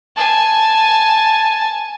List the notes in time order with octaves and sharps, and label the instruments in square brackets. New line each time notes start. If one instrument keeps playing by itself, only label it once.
[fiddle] G#5 A5